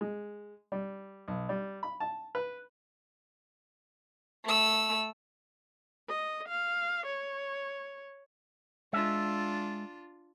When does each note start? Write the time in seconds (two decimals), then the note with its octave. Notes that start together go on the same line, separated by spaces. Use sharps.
0.01 G#3
0.72 G3
1.28 B1
1.49 G3
1.83 B5
2.00 A5
2.35 B4
4.45 A3 E6
6.09 D#5
6.48 F5
7.06 C#5
8.93 G#3 D4 F4 E5